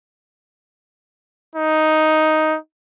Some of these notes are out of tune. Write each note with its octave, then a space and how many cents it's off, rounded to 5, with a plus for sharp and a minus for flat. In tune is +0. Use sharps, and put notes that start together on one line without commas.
D#4 +5